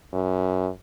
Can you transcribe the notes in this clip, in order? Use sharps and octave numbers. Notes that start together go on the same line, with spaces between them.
F#2